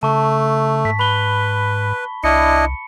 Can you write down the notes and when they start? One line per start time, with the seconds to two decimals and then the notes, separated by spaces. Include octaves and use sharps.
0.03 C#3 A3 A5 C#6
0.85 G#2 B6
0.99 B4 B5 G7
2.24 C2 D4 E4 D#5 C#7